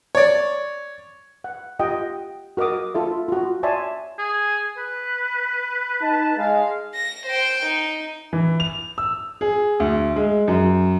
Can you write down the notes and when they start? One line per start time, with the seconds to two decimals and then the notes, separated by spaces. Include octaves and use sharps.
0.15 C#5 D5
1.44 F#5
1.79 F4 G4 D#5 F#5 G5 D#6
2.57 F#4 A#4 D#5 D6 D#6
2.95 F4 A4 E5
3.28 F4 F#4
3.63 C#5 D5 E5 G#5 A5 C6
4.18 G#4
4.77 B4
6.01 D#4 A5
6.37 G#3 F5
6.95 A#6
7.26 C5 G5
7.65 D#4
8.33 E3
8.60 F7
8.98 E6
9.41 G#4
9.80 D2
10.16 G#3
10.48 F#2